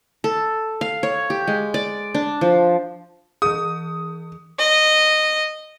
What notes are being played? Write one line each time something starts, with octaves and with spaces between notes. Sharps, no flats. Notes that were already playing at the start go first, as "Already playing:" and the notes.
A4
F5
C#5
G4
G#3
D5
D4
F3
E3 G#4 D#6
D#5